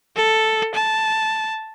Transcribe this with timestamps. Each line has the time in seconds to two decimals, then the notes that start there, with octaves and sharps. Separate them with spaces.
0.16 A4
0.75 A5